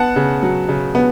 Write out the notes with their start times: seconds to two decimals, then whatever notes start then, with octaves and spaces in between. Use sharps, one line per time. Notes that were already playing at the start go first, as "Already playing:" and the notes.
Already playing: B3 F#5 A5
0.16 C#3
0.43 F#3
0.69 C#3
0.95 B3